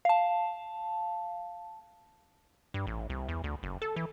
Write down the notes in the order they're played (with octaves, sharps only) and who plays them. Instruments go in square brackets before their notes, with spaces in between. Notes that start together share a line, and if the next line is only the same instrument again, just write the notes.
[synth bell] F5 A5
[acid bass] G2
A1
C2
E2
D2
F#1
A4
E3